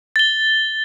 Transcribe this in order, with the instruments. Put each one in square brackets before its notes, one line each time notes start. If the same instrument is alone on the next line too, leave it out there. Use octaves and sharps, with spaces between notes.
[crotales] A6 G7